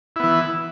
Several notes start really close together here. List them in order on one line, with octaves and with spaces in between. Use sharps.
E4 B3 E3